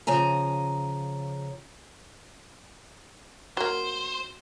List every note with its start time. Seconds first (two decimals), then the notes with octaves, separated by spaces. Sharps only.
0.07 C#3 F3 G#5 A#5
3.57 F#3 A#3 C5